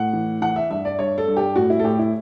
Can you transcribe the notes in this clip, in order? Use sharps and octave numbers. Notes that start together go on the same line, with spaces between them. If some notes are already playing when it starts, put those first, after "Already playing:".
Already playing: A2 F#5
E3
E3 F#5
E5
G2 E5
D5
G2 C#5
A4
G2
G4
A2 F#4
E4
A4
A2 G4
E4